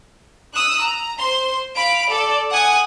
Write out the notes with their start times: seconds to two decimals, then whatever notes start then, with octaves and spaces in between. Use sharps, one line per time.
0.53 D#6 E6 F#6
0.83 A#5
1.19 C5 C6
1.76 F5 B5 D7
2.10 A4 D5
2.52 F#5 G#5 D#6